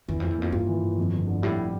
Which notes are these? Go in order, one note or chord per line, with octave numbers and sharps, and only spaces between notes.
E2 E3
F2 A2
E2
F2 A#3
G2 F4
E3
A2
F2
G1
D3
A2 G3